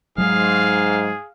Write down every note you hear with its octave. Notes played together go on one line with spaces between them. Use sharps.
G#2 F#3 G#3 G#4 F5